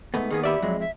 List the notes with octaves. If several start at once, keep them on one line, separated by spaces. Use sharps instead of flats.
G#2 A3 B3
D#3 A#3 B3 G#4
G4 D5 E5 B5
F2 F#3 G#3
E5